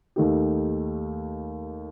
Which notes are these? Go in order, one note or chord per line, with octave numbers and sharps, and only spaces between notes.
D#2 D#3 A3 D#4 G4